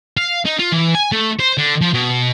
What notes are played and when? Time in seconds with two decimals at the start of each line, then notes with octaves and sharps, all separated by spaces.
0.17 F5
0.45 D#4
0.59 F4
0.72 E3
0.95 G#5
1.12 A3
1.40 C5
1.58 D3
1.81 F3
1.94 B2